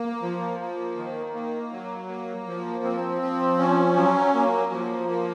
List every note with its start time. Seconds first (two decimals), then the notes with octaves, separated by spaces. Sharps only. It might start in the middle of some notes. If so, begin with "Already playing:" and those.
Already playing: A#3
0.22 F3
0.60 A#3
0.97 D#3
1.34 A#3
1.72 F#3
2.09 A#3
2.47 F3
2.84 C4
3.22 F3
3.59 C#4
3.96 F#3
4.34 A#3
4.72 F3
5.08 A#3